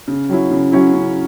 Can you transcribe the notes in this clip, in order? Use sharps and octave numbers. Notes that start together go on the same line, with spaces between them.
C#3
F#3 C#4 E4
C#3
F#3 C#4 E4
C#3